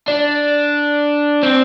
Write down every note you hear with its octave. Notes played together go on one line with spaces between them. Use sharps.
D4
C4